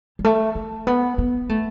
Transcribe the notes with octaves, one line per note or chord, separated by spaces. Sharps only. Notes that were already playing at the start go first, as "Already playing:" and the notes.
G3
A3
A3
B3
B3
A3